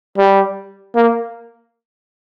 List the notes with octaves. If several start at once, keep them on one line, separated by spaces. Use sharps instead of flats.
G3
A#3